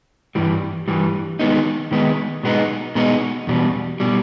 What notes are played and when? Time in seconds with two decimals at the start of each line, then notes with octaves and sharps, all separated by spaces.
0.35 G2 E3 G3
0.88 G2 E3 G3
1.39 D#3 G#3 B3 D#4
1.91 D#3 G#3 B3 D#4
2.43 B2 G#3 B3 D#4
2.95 B2 G#3 B3 D#4
3.47 E2 B2 G3
4.00 B2 G3